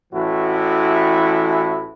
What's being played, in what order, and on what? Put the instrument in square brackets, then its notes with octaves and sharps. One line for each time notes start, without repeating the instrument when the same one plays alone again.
[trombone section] A1 A2 E3 E4 F#4